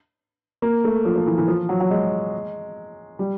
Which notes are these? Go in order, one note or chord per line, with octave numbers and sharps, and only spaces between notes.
A#3
A3
F3
F3
E3
E3
F3
F#3
F#3
G#3
G3